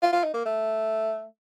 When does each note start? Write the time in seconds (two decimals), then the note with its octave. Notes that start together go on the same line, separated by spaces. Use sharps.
0.02 F4
0.13 F4
0.24 D#4
0.34 A#3
0.45 A3